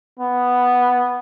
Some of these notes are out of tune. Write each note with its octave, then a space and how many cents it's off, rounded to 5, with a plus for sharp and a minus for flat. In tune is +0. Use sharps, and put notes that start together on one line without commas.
B3 +0